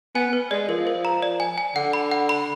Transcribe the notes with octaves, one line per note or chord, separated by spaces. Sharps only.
B3 G#5
B4
G#3 D5
F3 A#4
A#4
A#5
D5
G#5
G#5
D3 F#5
B5
F#5
B5